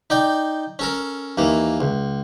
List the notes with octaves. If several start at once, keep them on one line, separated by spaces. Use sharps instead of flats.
D#4 D5 G5
C#4 A4 A#4
D#2 E3 A#3
C#2